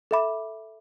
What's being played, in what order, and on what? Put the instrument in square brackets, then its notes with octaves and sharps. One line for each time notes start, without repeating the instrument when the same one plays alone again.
[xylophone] A4 E5 B5 D6